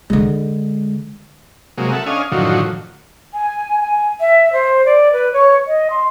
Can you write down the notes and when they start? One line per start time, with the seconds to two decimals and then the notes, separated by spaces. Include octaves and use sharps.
0.10 D3 G#3
1.78 C3 F#3 G#3 A#3
1.93 A4 E5 F#5
2.06 C#4 D4 D#5 F5 G#5
2.32 F#2 A2 D3 D#3 F3 F#3
3.34 G#5
3.81 G#5
4.20 E5
4.53 C5
4.85 D5
5.13 B4
5.33 C#5
5.67 D#5
5.90 C6